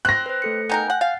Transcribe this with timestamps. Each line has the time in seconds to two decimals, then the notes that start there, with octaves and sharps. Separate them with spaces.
0.05 C4 F#6 A#6
0.26 B4 C5
0.42 A3 A4 C#7
0.70 B3 D#4 A#4 G5 G#5 G6
0.90 F#5
1.01 F5 F#5 A6 C7